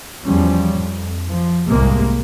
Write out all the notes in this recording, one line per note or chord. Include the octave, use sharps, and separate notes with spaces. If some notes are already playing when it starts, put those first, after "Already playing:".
E2 F3 G3 C#4
F2
F3
G1 C2 A2 C3 G#3 A#3